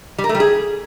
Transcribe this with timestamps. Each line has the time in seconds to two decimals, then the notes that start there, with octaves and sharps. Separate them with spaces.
0.18 G3
0.24 A#4
0.29 A3
0.35 G3
0.40 G#4